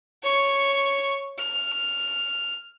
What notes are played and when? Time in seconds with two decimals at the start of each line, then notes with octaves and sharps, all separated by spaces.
0.23 C#5 C#6
1.38 F6